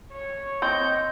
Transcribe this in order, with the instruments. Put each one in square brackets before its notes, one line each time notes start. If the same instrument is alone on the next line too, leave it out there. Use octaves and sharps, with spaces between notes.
[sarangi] C#5
[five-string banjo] C4 [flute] D#5 [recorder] G6